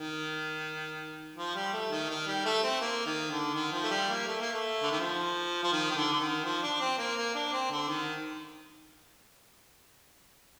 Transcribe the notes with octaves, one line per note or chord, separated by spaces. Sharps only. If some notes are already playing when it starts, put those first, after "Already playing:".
Already playing: D#3
F3
G3
A3
D#3
D#3
G3
A3
C4
A#3
D#3
D3
D#3
F3
A3
G3
A#3
A3
A#3
A3
D3
D#3
F3
F3
D#3
D#3
D3
D3
D#3
F3
D4
C4
A#3
A#3
D4
C4
D3
D#3